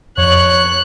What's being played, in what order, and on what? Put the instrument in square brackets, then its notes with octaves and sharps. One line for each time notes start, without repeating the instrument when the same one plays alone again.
[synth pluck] F2 [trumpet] C#5 [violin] F#6